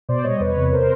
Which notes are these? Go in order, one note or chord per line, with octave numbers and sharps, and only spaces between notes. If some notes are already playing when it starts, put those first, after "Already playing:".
B2 C5 D5
G3 C#5 D#5
E2 B4 C#5
C3
A#4 C5